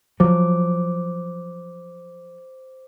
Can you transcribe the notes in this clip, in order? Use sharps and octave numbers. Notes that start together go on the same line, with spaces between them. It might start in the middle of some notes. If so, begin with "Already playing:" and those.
F3 F#3 C5 D6